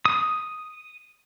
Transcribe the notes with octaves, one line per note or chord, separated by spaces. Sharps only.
D#6